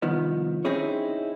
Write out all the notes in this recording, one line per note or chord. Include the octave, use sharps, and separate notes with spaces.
C2 D#3 F3 B3
C4 C#4 D#4 E4 G#4 C#5